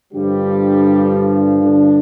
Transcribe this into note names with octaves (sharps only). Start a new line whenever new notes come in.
G2 D3 F3 G3 G4
D3 D4